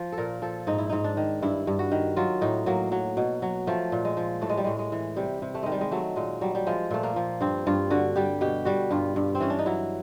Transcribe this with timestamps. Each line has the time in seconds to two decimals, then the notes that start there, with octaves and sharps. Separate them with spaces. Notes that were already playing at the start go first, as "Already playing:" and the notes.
Already playing: F3
0.12 A4
0.18 A#2 A#4
0.42 F3 A4
0.67 G#2 D#4
0.78 E4
0.89 G#2 D#4
1.04 D4
1.17 D#3
1.42 G2 E4
1.67 G2
1.79 F#4
1.92 D#3
2.16 F#3 F4
2.41 A2 D#4
2.66 F#3 A#3
2.92 F#3
3.17 B2
3.42 F#3
3.67 F3 A3
3.92 A#2
4.05 G#3
4.17 F3
4.41 A2 A3
4.49 G#3
4.57 G3
4.64 A2 G#3
4.79 G#3
4.92 E3
5.16 C3 G3
5.42 C3
5.55 A3
5.63 D#3 G#3
5.72 G3
5.81 G#3
5.91 F#3 A3
6.16 A#2 G#3
6.41 F#3 G3
6.55 G3
6.67 F3 G#3
6.91 A#2 A3
7.03 A#3
7.16 F3
7.41 G2 C4
7.67 G2 F4
7.90 D3 F#4
8.16 G3 G4
8.41 B2 G4
8.65 G3 F#4
8.91 G2 F4
9.16 G2
9.35 C4
9.40 E3 C#4
9.50 D4
9.59 D#4
9.66 F#3 E4